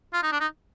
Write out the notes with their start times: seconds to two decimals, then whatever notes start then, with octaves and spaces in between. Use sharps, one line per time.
0.13 F4
0.23 D#4
0.32 D4
0.40 D#4